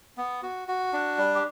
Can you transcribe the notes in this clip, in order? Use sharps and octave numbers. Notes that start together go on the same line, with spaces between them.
B3
F#4
F#4
D4
G3
G4